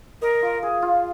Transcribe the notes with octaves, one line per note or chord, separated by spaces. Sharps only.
A#4 D#5
F4
G#4
F4